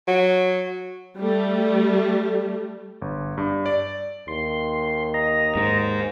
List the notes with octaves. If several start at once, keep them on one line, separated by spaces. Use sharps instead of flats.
F#3
G3 A3
G1
G2
D5
D#2 C6
D#5 A#5
G#2